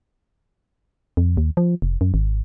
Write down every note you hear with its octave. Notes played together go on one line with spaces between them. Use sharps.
F2
D#2
F3
F1
F#2
G#1